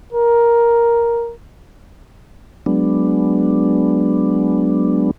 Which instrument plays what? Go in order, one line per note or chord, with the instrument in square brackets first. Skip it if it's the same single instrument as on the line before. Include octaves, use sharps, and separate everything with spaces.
[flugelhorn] A#4
[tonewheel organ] F#3 G#3 B3 D4